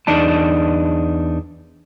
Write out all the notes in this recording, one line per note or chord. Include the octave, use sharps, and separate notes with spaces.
E2 D4 D#4 A5